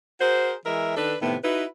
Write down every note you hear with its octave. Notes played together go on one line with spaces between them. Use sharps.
F#4 G#4 A#4 C5
E3 G#3 A#4 E5
D#3 D4 A4 B4
A2 C3 D#3 B3 E4
D#4 E4 F#4 B4